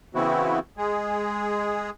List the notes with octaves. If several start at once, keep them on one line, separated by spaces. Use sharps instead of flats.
C#3 E3 B3 C4 E4 F#4
G#3 G#4